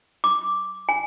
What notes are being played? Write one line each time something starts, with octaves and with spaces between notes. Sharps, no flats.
D6
G#5